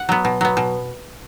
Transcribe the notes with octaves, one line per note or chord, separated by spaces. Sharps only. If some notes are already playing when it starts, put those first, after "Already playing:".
Already playing: F#5
F#3 B3
B2
F#3 B3
B2